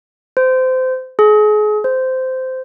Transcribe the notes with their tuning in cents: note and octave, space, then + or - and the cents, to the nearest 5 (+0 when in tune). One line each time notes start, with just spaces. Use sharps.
C5 -25
G#4 +35
C5 -15